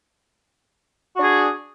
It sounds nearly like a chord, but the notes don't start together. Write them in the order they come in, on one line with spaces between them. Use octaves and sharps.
F#4 D4 G#4